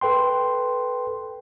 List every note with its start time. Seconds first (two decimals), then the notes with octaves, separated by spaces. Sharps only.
0.01 A4 B4 G5 C6